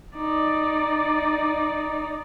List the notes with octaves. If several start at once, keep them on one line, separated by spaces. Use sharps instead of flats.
D#4 D5